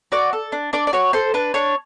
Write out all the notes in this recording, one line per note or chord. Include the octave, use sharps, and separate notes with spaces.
F#4 D5
A4
D4
D4 D5
D5
F#4 C#5
A4 C5
D4 B4
D4 C#5